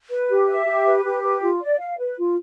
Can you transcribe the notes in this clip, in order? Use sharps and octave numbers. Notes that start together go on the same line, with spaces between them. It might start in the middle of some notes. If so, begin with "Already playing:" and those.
B4
G4
E5
G4
B4
G4
B4
F4
D5
F5
B4
F4